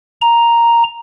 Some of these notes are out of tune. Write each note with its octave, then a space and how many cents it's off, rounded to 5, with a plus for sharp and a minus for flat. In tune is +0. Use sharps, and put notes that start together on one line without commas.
A#5 +0